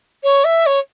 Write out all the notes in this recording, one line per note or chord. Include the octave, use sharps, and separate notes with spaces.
C#5
E5
C#5